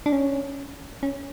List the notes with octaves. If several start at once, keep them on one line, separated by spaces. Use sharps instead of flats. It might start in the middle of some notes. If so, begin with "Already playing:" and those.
D4
C#4
C#4